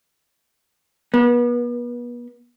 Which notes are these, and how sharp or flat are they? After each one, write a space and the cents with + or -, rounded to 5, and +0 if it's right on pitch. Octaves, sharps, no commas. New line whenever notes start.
B3 -35